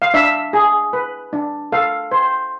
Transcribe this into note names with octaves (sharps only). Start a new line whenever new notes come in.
F5
D4 E5
G#4
B4
D4
A4 F5
C5